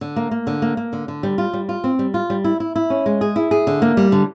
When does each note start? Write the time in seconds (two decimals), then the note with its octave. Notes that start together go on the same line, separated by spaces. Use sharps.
0.01 D3
0.16 A#3
0.31 A#3
0.47 D3
0.62 A#3
0.77 A#3
0.93 D3
1.08 D3
1.23 G3
1.38 F4
1.53 G3
1.69 F4
1.84 C4
1.99 G3
2.14 F4
2.30 G3
2.44 E4
2.60 E4
2.76 E4
2.90 C#4
3.06 G#3
3.21 G#4
3.36 E4
3.51 G#4
3.67 D3
3.82 A#3
3.97 G3
4.12 D3